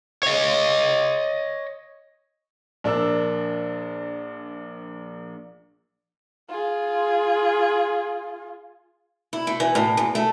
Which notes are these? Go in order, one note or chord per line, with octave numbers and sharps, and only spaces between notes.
C#5 D#5
A#1 D4 A#4 E6
F4 G#4
E4
A3
E3
A2
E2
A3